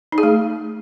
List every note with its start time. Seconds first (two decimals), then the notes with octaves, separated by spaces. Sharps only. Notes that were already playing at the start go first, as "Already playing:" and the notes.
0.12 D#4
0.18 G#4
0.23 A3